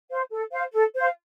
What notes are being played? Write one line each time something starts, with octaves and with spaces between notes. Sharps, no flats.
C5 F5
A4
C5 F5
A4
C5 F5